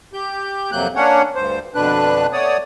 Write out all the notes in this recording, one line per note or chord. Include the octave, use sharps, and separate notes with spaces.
G4 G6
F2 C3 F#3 A#3 F#6 G6
A#3 C#4 D4 C#5 F#5
D2 G2 C5
F2 B2 D3 D4 B4 F#6
A3 B3 C#5 D5 D#6